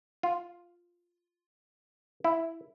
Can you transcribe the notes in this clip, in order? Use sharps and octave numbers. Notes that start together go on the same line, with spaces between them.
F4
E4